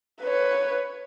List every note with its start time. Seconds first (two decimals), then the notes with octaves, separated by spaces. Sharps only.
0.22 B4 C#5